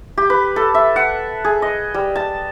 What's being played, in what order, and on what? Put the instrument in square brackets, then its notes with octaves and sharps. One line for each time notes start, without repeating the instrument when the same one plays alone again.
[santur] G4
B4
A4
E5
F#5
G#4
D#5
G3
A5